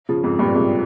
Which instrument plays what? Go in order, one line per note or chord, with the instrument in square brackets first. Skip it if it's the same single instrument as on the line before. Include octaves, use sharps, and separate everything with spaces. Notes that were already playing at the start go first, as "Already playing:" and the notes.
[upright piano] C#3 F3
F2 G#2
G2 A#2
G#2 C3